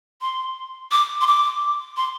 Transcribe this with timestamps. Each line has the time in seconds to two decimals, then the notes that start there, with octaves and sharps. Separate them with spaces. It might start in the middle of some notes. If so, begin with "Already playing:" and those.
0.21 C6
0.92 D6
1.21 C6
1.27 D6
1.97 C6